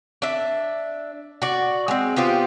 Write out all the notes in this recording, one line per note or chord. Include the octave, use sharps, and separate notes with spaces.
D4 E5
F#4 D5
G#3 C4
B3 F4 G4 C5